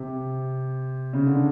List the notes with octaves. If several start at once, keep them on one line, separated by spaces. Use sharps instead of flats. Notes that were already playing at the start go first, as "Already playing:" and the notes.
Already playing: C3
C#3
D3